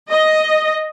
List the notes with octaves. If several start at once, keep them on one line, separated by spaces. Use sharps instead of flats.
D#5